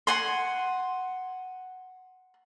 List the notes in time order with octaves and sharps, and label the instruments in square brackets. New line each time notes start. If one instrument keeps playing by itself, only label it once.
[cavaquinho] F#5 G#5 C6